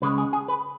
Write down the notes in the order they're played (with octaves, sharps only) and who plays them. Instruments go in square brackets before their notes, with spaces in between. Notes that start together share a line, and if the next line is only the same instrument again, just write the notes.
[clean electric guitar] C#2 C#3 G#3 B4
G#4
G#4
B4